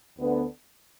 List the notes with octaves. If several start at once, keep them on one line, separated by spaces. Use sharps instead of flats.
D2 D3 B3